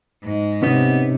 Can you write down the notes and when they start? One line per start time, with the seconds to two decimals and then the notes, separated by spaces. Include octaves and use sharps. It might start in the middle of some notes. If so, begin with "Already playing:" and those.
0.23 G#2 G#3
0.63 C3 B3 C#4 D#4 D#5